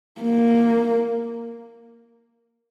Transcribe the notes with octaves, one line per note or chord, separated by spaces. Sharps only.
A#3